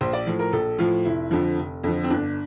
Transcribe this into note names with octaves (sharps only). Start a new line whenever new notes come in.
A#1 C5
D5
A2 F3
A#4
A#1 A4
A2 F3 F4
F1 E4
F2 D3 F3
F1
F2 D3 F3
C4
G1 D4